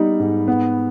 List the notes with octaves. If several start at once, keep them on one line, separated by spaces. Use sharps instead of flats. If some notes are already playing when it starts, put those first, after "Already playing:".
Already playing: G3 B3 D#4
G#2
B3